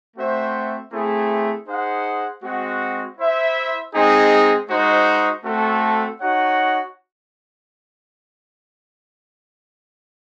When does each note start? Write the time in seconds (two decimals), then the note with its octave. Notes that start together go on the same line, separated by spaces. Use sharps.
0.17 A3 C4 F#4 C5 E5
0.92 A3 C4 E4 G#4
1.68 D#4 G#4 C5 F#5
2.44 G#3 C4 F#4
3.19 E4 C5 E5
3.94 G#3 C4 D#4 G#4
4.70 G#3 D#4 F#4 C5
5.44 A3 C4 F#4 A4
6.20 D#4 F#4 C#5 F#5